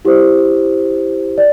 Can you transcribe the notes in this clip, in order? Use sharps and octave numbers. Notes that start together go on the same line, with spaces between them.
E4 G4 C5
D5